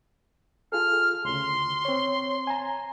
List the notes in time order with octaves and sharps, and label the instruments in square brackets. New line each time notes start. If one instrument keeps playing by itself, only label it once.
[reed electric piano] F4 G#4 A4 [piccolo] F6
[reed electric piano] D2 C#3 [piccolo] C6
[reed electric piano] C4 C#5
G#5 A#5